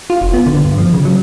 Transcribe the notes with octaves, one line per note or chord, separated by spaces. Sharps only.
F4
F1
B3
D3
G2
F3
C#3
F#3